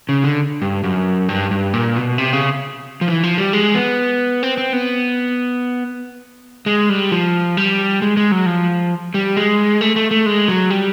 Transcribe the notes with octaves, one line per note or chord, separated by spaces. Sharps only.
C#3
D3
G2
F#2
G2
G2
A#2
B2
C3
C#3
F3
E3
F3
G3
G#3
B3
C4
C4
B3
G#3
G3
F3
G3
G#3
G#3
F#3
F3
G3
G#3
A3
A3
A3
G#3
F#3
G3